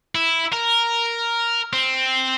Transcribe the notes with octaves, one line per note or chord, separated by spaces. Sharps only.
E4
A#4
C4